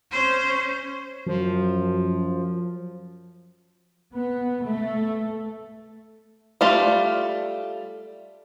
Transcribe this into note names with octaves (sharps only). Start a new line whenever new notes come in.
C#4 C5
F#2 F3
B3
A3
G3 A3 F4